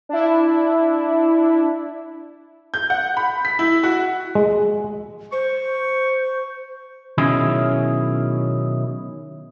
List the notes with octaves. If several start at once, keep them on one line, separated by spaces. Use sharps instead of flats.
D4 E4
G6
F#5
B5
B6
E4
F#4
G#3
C5 C#6
B2 D#3 F#3 C#4 E4 G#4